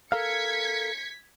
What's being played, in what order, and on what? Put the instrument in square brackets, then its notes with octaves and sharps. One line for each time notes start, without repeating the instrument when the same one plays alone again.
[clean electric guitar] A4 A#4 F5 [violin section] G#6 B6 C#7